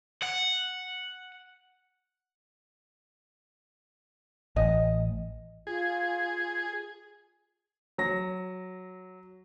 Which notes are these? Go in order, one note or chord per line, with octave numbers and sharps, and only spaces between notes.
F#5
A1 D#5
F4 G#4
F#3 A#6